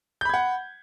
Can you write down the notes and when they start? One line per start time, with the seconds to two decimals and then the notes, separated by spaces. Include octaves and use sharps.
0.21 G6
0.25 B5
0.29 G#6
0.34 F#5